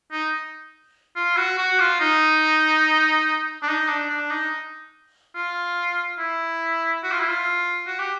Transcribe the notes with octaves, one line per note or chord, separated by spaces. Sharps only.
D#4
F4
F#4
F#4
F4
D#4
D4
D#4
D4
D4
D#4
F4
E4
F#4
F4
E4
F4
F#4
G4